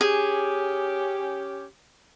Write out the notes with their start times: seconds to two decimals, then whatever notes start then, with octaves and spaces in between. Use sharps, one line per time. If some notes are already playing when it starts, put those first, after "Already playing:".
0.01 C#4 G4 G#4